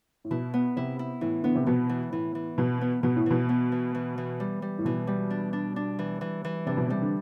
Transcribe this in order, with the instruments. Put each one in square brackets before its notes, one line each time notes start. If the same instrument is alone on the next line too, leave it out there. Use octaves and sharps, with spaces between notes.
[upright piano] A2
[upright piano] B2 [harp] E4
[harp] B3
[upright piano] C3 [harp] E4
[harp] E4
[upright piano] A2 [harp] E3
[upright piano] D3 [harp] B3
[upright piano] C3
[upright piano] B2 [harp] B3
[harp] E3
[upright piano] A2 [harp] E3
[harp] E3
[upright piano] B2 [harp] B3
[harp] B3
[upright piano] B2 [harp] B3
[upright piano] A2
[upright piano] B2 [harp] E3
[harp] B3
E3
E3
E3
G3
G3
[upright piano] A2
[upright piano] B2 [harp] E3
[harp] G3
D4
D4
D4
E3
E3
E3
[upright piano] C3 [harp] D4
[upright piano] B2
[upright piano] C3 [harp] G3
[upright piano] D3